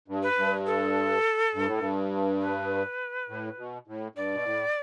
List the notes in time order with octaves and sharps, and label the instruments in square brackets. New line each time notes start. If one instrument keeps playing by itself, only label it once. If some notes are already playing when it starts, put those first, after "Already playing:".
[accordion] G2
[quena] B4
[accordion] G2
[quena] A4
[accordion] G2
A2
G2
[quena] B4
[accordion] A2
B2
A2
[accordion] G2 [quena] D5
[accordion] B2
A2